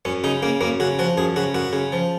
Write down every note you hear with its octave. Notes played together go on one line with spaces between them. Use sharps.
F#2 C#4
C#3 D#4
C#3 A#3
F#2 A#3
C#3 F#4
F3 F#4
F#2 G#4
C#3 F#4
F#2 F#4
C#3
F3